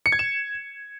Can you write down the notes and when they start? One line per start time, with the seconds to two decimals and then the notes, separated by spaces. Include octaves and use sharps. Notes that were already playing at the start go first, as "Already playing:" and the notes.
0.06 C#7
0.12 G#6
0.19 E7